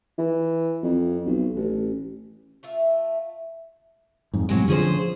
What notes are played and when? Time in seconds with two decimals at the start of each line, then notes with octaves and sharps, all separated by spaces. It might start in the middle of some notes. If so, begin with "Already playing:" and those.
0.18 E3
0.83 F2
1.26 B1
1.56 A1
2.63 A3 F4 E5
4.34 F2 G#2
4.49 F#2 A2 C3 F#3 G#3
4.68 D3 F3 C#4 G#4 C5